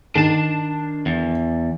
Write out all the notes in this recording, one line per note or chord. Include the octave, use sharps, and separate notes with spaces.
D#3 D4 A5
E2